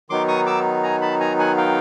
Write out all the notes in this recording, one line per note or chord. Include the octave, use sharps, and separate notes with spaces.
D#3 F#3 B3 D#4 C6 D6
C#6 D#6
D6 E6
G#5 A#5
A5 B5
G#5 A#5
F#5 G#5
F5 G5